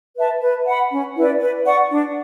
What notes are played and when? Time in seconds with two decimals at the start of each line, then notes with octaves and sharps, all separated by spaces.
0.18 B4 E5 A5
0.42 B4
0.67 F#5 B5
0.92 C#4
1.17 E4 B4 D5
1.40 B4
1.66 D5 F#5 C#6
1.90 D4